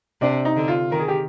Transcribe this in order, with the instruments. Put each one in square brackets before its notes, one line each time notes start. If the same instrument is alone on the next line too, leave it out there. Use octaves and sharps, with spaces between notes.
[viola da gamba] C3 [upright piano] D4
[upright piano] D#4
[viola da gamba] D3
[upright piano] F4
[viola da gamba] D#3 [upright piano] A#4
[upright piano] G#4
G4